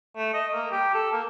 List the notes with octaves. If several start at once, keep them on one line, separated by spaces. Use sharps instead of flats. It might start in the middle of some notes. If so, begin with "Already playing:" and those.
A3
D#5
A#3
G4
A4
A#3